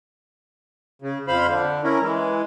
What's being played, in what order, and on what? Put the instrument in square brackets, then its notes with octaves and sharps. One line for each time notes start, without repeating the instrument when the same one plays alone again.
[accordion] C#3
F2 C5 F5 B5
D3
C#4 E4 A#4
E3 G#3